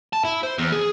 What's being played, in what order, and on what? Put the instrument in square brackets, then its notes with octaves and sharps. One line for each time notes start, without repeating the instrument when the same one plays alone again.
[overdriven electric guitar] A5
E4
C5
E2
G#4